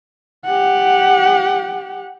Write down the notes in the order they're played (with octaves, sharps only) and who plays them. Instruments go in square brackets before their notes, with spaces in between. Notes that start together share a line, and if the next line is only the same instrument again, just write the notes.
[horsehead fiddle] G4 F#5